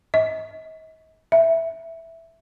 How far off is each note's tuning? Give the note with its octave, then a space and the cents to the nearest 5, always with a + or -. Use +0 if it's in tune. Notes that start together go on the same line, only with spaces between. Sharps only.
D#5 +40
E5 +0